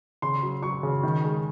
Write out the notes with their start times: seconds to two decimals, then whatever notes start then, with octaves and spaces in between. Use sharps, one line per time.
0.22 C#3 C6
0.43 F#3
0.63 F#3 C#6
0.83 C#3
1.03 D#3
1.24 G#3